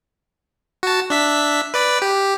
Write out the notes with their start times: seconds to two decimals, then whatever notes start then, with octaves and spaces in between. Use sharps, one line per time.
0.83 F#4 A5
1.10 D4 E5 B6
1.74 B4 D5 B5
2.02 G4